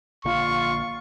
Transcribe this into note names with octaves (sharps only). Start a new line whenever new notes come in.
A#1 D3 A#3 F4 C#6